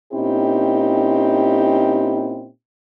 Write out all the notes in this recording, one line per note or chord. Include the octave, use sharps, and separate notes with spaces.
A#2 C4 C#4 D#4 E4 G4